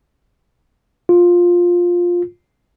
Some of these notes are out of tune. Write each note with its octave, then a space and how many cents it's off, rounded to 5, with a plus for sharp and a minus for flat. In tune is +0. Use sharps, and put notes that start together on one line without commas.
F4 +10